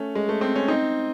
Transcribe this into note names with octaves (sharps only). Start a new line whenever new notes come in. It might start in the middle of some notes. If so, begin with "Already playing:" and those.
Already playing: A3 C#4
G#3
A3
C4
C#4
C4 D#4